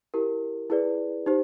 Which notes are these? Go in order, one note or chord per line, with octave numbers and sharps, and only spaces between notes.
E4 G4 A#4
E4 G#4 B4 D5
D#4 G4 C5